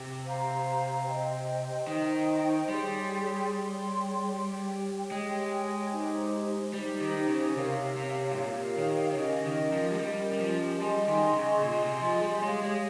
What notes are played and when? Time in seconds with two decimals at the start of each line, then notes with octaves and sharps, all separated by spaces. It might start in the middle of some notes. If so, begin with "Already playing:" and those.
Already playing: C3
0.24 C5 F5 A#5
1.06 C5 D#5 G5
1.87 D#3 C5 D#5 G5
2.68 G3 G#4 C#5 G5 C6
3.49 G#4 C#5 G5 C6
4.31 G4 C#5 G5
5.11 G#3 G4 C#5 G5
5.92 D#4 G4 C5
6.74 G3 D#4 G4 C5
7.01 D#3
7.28 C#3
7.56 C3 G4 A#4 C#5 F5
7.96 C3
8.31 G#2
8.36 A#2 G4 A#4 C#5 F5
8.77 D#3
9.10 D#3
9.17 C#3 C#4 G4 A#4 D#5
9.45 D#3
9.72 F3
9.91 G#3
9.99 G3 C#4 G4 A#4 D#5
10.33 G3
10.39 F3
10.80 G3 G#4 D#5 G#5 C6
11.07 D#3
11.34 C#3
11.61 A#2 G#4 D#5 G#5 C6
11.72 A#2
11.82 C3
12.01 F3
12.21 G3
12.43 G#3 G4 C#5 F5
12.62 G#3